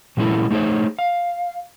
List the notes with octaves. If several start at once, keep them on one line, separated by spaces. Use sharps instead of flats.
A#2 F#3 G#3 C#4 E4 A4
A3 D#4 G#4 C5 C#5
F5